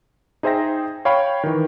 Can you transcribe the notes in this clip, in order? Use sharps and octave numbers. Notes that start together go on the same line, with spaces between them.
D#4 G#4 C5 E5 G5 A#6
C#5 F5 G5 B5 C#6
D#3 E3